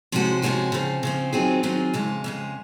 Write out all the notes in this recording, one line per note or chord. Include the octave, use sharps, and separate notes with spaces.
C3 F3 G#3 C#4 F#4
C3 F3 G#3 C#4 F#4
C#3 F3 C4
C#3 F3 C4
D#3 F#3 C4 F4 G#4
D#3 F#3 C4 F4 G#4
F2 C#3 G#3
F2 C#3 G#3